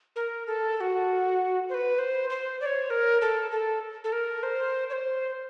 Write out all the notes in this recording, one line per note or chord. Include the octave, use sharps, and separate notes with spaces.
A#4
A4
A4
F#4
C5
B4
C5
C5
D5
C#5
A#4
A4
A4
A4
A#4
C5
C#5
C5